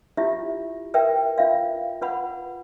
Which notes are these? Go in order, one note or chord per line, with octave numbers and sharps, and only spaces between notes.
E4 F4 G4 E5
A#4 B4 E5 G5
F4 E5 F5
F4 B4 F#5 B5